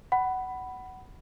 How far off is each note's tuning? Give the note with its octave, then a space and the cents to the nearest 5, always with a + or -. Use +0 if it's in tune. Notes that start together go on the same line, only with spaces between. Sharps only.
F#5 +20 B5 +0